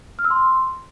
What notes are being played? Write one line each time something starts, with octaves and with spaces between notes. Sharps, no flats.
F6
E6
C6